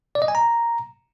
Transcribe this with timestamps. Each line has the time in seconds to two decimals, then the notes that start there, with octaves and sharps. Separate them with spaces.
0.15 D5
0.22 D#5
0.28 G#5
0.35 A#5